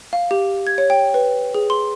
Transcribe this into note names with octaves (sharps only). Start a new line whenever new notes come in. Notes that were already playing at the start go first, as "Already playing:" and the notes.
F5
G4
G#6
C#5
G5
B4
G#4
C6